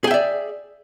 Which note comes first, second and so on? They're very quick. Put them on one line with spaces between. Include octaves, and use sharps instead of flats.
G#4 G5 E5 D5